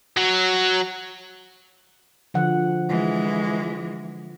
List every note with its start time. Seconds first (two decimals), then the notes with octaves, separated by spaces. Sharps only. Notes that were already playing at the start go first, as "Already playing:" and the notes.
0.17 F#3
2.34 D3 F3 F#5
2.89 E3 G#3